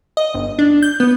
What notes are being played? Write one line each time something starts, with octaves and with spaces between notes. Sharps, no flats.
D#5
G1
D4
G6
B3